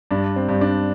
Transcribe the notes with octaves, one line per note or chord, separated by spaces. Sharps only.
G2 D4
C4
G2
D4